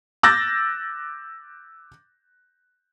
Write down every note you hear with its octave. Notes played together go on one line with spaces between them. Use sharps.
D6 E6 F#6 G6 A6 A#6